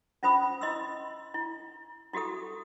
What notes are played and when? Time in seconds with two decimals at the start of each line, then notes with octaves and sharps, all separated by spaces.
0.23 C#4 F4 C5 B5 D#6
0.61 E4 D#5 C6 E6
1.34 E4
2.13 E4 F#4 G4 A4 D#6